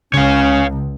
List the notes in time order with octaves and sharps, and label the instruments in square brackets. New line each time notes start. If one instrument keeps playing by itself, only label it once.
[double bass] C#2 [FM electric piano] C#3 [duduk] C#4 [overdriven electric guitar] C#5 F5